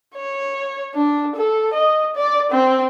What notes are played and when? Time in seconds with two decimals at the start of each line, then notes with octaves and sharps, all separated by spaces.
0.15 C#5
0.94 D4
1.36 A4
1.73 D#5
2.15 D5
2.52 C4